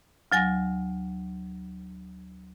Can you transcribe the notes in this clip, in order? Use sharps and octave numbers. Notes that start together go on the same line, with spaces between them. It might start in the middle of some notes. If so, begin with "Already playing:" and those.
D2 F#3 G#5 A#6